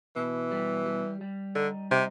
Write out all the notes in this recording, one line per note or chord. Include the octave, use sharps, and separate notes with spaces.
B2 E3
G3
G3
G3
D3 D#4
C3 D#4